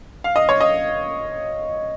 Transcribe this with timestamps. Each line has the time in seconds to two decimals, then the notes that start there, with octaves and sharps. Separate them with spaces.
0.24 F5
0.36 D#5
0.49 C#5
0.61 D#5